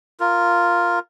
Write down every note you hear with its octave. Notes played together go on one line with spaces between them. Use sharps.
F4 A#4